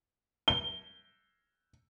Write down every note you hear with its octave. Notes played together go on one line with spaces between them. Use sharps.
G7